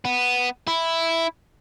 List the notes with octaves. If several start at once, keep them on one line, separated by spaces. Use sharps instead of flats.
B3
E4